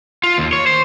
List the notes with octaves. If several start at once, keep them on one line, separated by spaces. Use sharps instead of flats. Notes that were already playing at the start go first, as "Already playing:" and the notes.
F4
D#2
C#5
C5